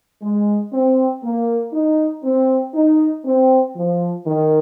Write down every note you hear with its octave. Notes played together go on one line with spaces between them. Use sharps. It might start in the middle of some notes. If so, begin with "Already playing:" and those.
G#3
C4
A#3
D#4
C4
D#4
C4
F3
D#3